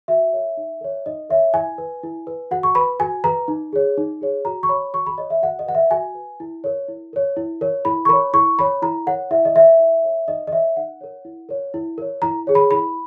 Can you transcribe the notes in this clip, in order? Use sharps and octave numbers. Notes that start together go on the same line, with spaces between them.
F#4 E5
A#4 C#5
D#4
A#4 C#5
D#4 D#5
A#4 C#5 E5
E4 G#5
B4
E4
B4
F#4 F#5
C#6
B4 B5
F#4 G#5
B4 A#5
D#4
G#4 C#5
D#4
G#4 C#5
F#4 A#5
C#6
C#5 B5
F#4 C#6
B5
C#5 D#5
E5
F#4 F#5
D#5
B4 F#5
E5
F#4 G#5
B4
E4
A#4 C#5
E4
A#4 C#5
E4
A#4 C#5
E4 B5
C#6
A#4 C#5 B5
E4 C#6
A#4 C#5 B5
E4 A#5
A#4 C#5 F#5
E4 E5
D#5
A#4 C#5 E5
E4
A#4 C#5
D#4 D#5
D#5
A#4 C#5 E5
D#4 F#5
A#4 C#5
E4
A#4 C#5
E4
A#4 C#5
E4 A#5
G#4 C#5
B5
E4 B5